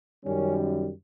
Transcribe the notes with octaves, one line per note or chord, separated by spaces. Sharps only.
F#2 D#3 G3 C#4